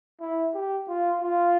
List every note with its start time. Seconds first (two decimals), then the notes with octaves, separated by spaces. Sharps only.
0.21 E4
0.54 G4
0.88 F4
1.22 F4